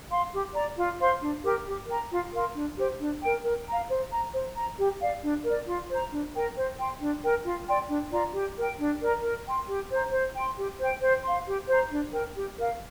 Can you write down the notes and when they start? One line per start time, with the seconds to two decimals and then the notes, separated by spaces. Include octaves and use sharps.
0.10 F5 C6
0.32 G4
0.54 D5 A#5
0.77 F4
0.99 C5 F5 C6
1.21 D4
1.43 G4 A#4 G5
1.66 G4
1.88 A#4 G5 A#5
2.11 F4
2.33 A#4 F5 C6
2.55 D4
2.77 G4 C5
2.99 D4
3.22 A#4 G5
3.44 A#4
3.67 F5 A#5
3.89 C5
4.11 A#5
4.33 C5
4.55 A#5
4.78 G4
5.00 D5 F5
5.23 D4
5.45 A#4 D5
5.67 F4
5.89 C5 A#5
6.12 D4
6.34 A#4 G5
6.56 C5
6.79 G5 C6
7.01 D4
7.23 A#4 G5
7.45 F4
7.68 D5 G5 C6
7.89 D4
8.12 F4 D5 A#5
8.35 G4
8.57 A#4 G5
8.80 D4
9.01 A#4 D5 A#5
9.23 A#4
9.46 G5 C6
9.68 G4
9.91 C5 A#5
10.13 C5
10.35 G5 C6
10.58 G4
10.80 C5 G5
11.02 C5
11.24 F5 C6
11.47 G4
11.68 C5 A#5
11.91 D4
12.13 A#4 G5
12.36 G4
12.58 A#4 F5